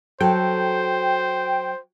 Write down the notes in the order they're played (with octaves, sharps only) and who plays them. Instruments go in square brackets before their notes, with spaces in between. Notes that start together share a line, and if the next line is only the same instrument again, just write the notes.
[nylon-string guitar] F#3 A4 [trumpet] C5 [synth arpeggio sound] G5